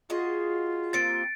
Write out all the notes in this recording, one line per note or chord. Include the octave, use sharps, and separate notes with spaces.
F4 F#4 G#4 D#5
A#3 C4 G4 A6 C#7 D7